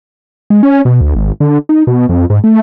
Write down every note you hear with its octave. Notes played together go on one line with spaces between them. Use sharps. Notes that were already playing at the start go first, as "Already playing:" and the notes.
G#3
C#4
B2
D2
G#1
D3
D#4
B2
F2
G#2
A3